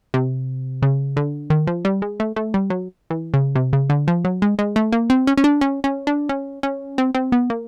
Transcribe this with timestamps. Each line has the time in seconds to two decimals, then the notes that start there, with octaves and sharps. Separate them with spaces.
0.14 C3
0.82 C#3
1.17 D3
1.50 D#3
1.67 F3
1.85 G3
2.02 G#3
2.20 A3
2.36 A3
2.54 G3
2.70 F#3
3.10 E3
3.34 C#3
3.55 C3
3.73 C#3
3.90 D3
4.08 F3
4.25 F#3
4.42 G#3
4.59 G#3
4.76 A3
4.92 A#3
5.10 C4
5.27 C#4
5.37 C#4
5.44 D4
5.61 C#4
5.84 C#4
6.07 D4
6.29 C#4
6.63 C#4
6.98 C4
7.15 C4
7.32 B3
7.50 A#3